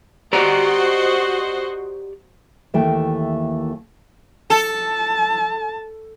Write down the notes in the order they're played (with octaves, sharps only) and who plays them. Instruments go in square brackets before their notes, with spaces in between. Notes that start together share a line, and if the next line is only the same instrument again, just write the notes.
[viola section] F#4 C5 D#5 [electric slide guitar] G4 D5 A#5
[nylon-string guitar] D#2 E3 A3 A#3 G5
[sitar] A4 [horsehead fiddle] A5